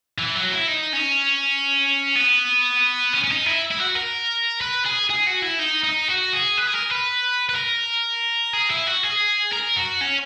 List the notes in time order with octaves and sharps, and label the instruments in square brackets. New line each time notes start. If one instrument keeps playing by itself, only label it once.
[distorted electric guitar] E3
F#3
E4
D#4
C#4
B3
C#4
C#4
D#4
E4
E4
F#4
A#4
B4
G#4
G#4
F#4
E4
D#4
D#4
F#4
G#4
B4
G#4
A#4
B4
B4
A#4
G#4
E4
F#4
G#4
A#4
F#4
C#4